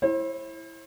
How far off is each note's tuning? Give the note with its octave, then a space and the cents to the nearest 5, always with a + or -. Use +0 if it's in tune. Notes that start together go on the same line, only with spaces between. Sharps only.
E4 +0 C5 +40